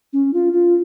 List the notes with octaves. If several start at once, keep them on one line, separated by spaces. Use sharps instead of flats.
C#4
F4
F4